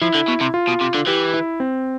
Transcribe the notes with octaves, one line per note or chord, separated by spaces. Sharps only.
F3 E4
D3
B2
C3
F4
B2
C3
D3
E3 G4
E4
C4